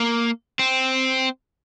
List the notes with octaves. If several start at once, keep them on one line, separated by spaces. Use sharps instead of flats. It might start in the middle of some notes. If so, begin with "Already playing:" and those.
Already playing: A#3
C4